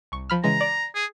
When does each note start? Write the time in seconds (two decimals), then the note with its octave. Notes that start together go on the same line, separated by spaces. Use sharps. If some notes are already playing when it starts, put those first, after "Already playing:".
0.12 C2 C#6
0.30 F3 B5 F6
0.44 C#3 E3 G#3 A#5
0.61 D5
0.95 G#4